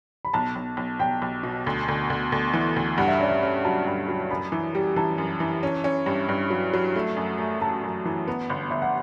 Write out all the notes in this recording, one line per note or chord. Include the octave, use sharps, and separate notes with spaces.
B5
B1 A5
B1
B1
B1 G5
B1
B2
D2
D2
D2
D2
E3
D2
G2 F#5
E5
C#4 D5
E5
C#4
F#3 A5
G2
F#3
F#2 B5
E3
G3
E3 A5
F#2
E3
C#4
C#4
G2
G2
F#3
F#3
A3
F#2
A3
A3 A5
F#2
E3
B3
G1
G1 E5
F#5